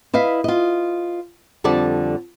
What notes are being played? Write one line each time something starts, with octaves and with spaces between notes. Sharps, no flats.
E4 B4 D#5 F5
F4 D#5
F2 D3 G3 D5 A5